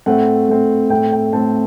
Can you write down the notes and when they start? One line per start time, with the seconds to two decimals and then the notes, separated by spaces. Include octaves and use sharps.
0.06 A2 A3 C4 F#5
0.49 A2 A3 C4
0.90 A2 A3 C4 G5
1.13 G5
1.33 A2 A3 C4 A5